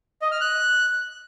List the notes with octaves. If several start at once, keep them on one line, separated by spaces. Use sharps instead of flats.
D#5
F6
F#6